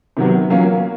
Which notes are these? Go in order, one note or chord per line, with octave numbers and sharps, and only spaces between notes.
C3 D#3 F#3 B3
F#3 A#3 C#4 F4